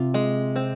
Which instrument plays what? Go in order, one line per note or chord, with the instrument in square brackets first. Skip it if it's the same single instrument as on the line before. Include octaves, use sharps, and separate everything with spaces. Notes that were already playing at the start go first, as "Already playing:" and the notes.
Already playing: [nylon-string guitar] C3 [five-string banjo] F4
[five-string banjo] G#3
C4